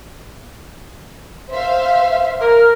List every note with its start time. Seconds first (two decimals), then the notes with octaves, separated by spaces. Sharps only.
1.51 C5 E5 F5
2.41 A#4